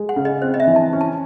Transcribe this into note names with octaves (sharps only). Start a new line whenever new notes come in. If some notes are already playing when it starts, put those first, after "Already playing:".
Already playing: G#3
F#5
C#3
D#5
C4 C5
D#5
E5
E3
A5
C#4
A5